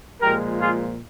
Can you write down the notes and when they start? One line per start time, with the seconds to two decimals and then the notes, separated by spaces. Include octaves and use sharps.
0.22 A#2 F3 G#3 G4 A#4
0.59 F4 G#4